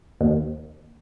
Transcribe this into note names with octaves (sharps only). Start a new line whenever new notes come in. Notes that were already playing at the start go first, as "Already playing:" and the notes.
D#2